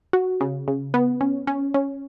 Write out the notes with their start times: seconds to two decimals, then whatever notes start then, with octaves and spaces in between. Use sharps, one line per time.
0.13 F#4
0.41 C#3
0.68 C#3
0.94 B3
1.21 C#4
1.47 C#4
1.74 C#4